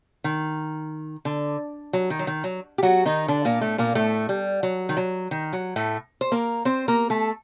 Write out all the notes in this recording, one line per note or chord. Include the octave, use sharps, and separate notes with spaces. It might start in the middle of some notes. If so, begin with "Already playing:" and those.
D#3
D3
F#3
D#3
F#3
D#3
F#3
G4
F#3 F#4
D#3 D#4
D3 D4
A#2 A#3
A2 A3
A#2 A#3
A2 A3
G3
F#3
D#3
F#3
D#3
F#3
A2 A3
C5
A#3 A#4
C4 C5
A#3 A#4
A3 A4